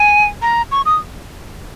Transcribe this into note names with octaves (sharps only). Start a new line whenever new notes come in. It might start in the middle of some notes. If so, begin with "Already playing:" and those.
Already playing: G#5
A#5
C#6
D#6